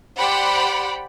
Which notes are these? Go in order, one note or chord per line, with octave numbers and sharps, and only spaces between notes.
G4 C5 D5 F#5 G5 B5